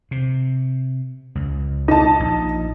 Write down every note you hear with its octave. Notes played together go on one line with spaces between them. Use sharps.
C3
C#2
D#4 A5
A#1